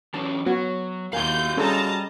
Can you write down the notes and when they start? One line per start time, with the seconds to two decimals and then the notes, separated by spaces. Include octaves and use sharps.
0.14 E3 F#3 C#4 A5
0.46 F#3 B3 F#4 C#5
1.13 D#2 F#4 A#4 F5 G#5 G6
1.57 G3 C#4 G#4 A4 D#5 A5 A#5